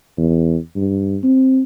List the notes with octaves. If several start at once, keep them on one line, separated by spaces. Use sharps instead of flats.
E2
G2
C4